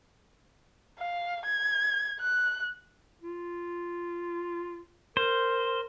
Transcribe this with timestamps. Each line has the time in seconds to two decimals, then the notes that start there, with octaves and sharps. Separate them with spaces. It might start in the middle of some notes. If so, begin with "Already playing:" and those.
0.99 F5
1.45 G#6
2.20 F#6
3.22 F4
5.17 A#4 C5